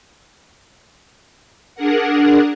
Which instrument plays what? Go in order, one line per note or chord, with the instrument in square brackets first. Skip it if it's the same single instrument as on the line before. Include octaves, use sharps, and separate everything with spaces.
[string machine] D4 G#4 A#4 F#5